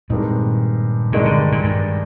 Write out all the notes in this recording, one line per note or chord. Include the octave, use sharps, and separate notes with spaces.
G2 A#2 D#3 G#3 C4 D#4
G2 A#2 D#3 G#3 D4
D3
A#2
G2